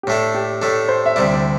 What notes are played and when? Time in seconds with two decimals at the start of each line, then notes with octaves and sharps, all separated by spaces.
0.03 G4
0.07 A2 A3 D4 A4
0.35 G4
0.61 A2 A3 D4 A4
0.89 C5
1.06 E5
1.16 D2 C3 G3 E4 D5
1.34 D5